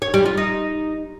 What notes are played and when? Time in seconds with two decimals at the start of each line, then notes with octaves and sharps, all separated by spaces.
0.02 C#5
0.14 G3
0.26 F4
0.37 D#4